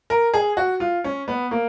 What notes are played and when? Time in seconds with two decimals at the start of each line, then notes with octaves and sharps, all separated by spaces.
0.10 A#4
0.34 G#4
0.57 F#4
0.80 F4
1.04 C#4
1.28 B3
1.51 A#3